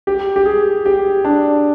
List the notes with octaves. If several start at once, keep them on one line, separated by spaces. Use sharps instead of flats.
G4
G4
G#4
G4
D4